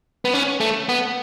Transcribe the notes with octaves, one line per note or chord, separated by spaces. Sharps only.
B3
C#4
A3
B3